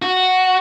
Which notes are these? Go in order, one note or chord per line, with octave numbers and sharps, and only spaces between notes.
F#4